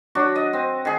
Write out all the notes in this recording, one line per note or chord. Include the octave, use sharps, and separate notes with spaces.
F#3 D4 F#4
D#5
C4
D#3 G#4